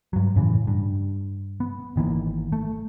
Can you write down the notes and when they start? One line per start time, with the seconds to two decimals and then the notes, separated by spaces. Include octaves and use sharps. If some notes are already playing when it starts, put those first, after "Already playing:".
0.13 G2 F#3
0.36 F2 A2 C#3 E3
0.67 G2
1.60 B3
1.96 G#1 D#3 E3 A#3
2.52 A3